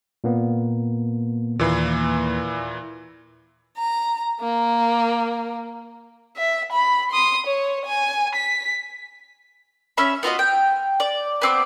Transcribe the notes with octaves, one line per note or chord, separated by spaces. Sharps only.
A#2 A#3 B3
D#2 A#2 E3 B5 C7
A#5
A#3
E5
B5
C6 D#6
C#5
G#5
B6
C#4 E5 B5
B3 F4 F#4 D#5
G5
D5
B3 C4 D6